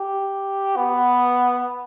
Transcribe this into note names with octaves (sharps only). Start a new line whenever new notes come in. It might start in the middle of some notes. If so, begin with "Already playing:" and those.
Already playing: G4
B3